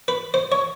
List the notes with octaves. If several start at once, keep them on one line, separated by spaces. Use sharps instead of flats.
B4
C5
C#5